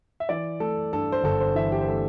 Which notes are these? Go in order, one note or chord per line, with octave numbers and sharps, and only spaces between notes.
E5
E3 D5
A3 A4
G2 A4
C5
G1 A4
C5
E3 E5
G4
C5
A3 A4